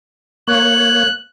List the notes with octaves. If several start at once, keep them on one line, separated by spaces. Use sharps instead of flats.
A#3 C#5 F#6